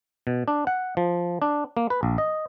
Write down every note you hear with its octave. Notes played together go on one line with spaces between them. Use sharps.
B2
D4
F#5
F3
D4
A#3
B4
A#1
D#5